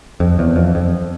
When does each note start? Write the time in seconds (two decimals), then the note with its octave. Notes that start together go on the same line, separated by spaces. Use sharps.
0.20 F2
0.39 E2
0.56 F2
0.75 F2